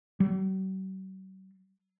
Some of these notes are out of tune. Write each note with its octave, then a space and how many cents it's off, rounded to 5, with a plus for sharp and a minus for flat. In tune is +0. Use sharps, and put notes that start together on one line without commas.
F#3 +45